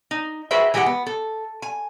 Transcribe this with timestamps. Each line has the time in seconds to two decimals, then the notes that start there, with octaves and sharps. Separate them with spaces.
0.11 D#4
0.51 F#4 G#4 B4 C5 E5 G5
0.74 E3 G#3 G4 A4 F#5
0.86 B3
1.07 A4
1.62 G#5